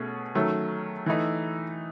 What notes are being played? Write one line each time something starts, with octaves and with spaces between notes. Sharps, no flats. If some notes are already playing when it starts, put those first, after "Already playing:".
Already playing: B2 A3 C#4 G#4
D#3 F#3 A3 C#4
E3 A3 D#4